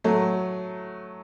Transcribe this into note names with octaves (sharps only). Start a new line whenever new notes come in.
F#3 A3